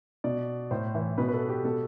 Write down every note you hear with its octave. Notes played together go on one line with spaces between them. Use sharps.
B2 D5
A2 C5
E3
B2 B4
B4
A4
G4
B2 A4